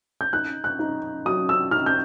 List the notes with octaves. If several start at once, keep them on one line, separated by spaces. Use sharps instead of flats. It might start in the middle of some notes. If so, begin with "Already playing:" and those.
G6
D#4 F#6
F#6
D#4
F#3 D#6
E6
D#4 F6
G6